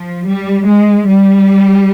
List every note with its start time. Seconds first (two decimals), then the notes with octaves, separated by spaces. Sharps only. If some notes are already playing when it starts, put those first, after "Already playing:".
Already playing: F3
0.28 G3
0.66 G#3
1.07 G3